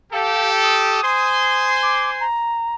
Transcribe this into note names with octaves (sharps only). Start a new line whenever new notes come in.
G4 A4 F5
D#6
C5 G#5 C6
D6
A#5